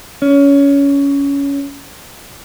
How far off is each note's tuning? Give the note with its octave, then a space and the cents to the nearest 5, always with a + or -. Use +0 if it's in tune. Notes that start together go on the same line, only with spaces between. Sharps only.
C#4 +20